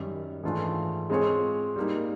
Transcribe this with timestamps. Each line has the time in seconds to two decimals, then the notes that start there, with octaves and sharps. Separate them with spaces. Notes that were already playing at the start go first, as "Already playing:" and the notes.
Already playing: F#2 D#3 G3
0.43 G#2 E3 A3 D4 F4
1.10 G#3 C4 F4 G#4 C#5
1.76 G3 A#3 D#4